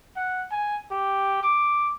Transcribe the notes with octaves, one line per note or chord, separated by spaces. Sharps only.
F#5
G#5
G4
D6